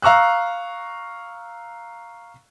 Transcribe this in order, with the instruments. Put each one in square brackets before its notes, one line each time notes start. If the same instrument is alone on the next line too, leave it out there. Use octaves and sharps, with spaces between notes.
[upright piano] F5 A#5 C#6 E6 F#6